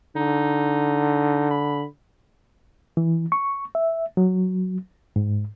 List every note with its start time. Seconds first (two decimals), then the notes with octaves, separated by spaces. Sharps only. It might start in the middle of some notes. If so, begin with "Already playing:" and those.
0.16 D3 D#4
1.50 B5
2.97 E3
3.32 C#6
3.75 E5
4.17 F#3
5.16 G#2